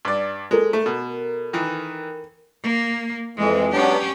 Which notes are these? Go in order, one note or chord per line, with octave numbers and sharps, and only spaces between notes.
G2 D5
G#3 A4 A#4
A3
B2
D#3 E3
A#3
F2 E3 G#3
F#3 B3 C#4 D4 G4